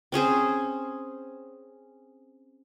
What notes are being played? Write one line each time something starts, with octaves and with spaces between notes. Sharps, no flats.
C4 C#4 G#4 C5